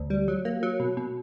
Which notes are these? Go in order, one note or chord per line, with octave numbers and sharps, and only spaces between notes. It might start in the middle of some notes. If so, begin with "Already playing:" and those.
Already playing: D2
G3
F#3
A#3
F#3
B2
B2